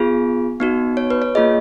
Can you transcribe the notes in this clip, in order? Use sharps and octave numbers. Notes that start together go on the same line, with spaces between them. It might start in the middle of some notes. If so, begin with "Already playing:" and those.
Already playing: B3 F4 G#4
B3 D#4 F#4
C#5
B4
C#5
A#3 F4 G#4 D#5